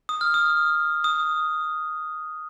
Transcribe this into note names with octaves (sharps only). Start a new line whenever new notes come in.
D#6
F6
D#6
D#6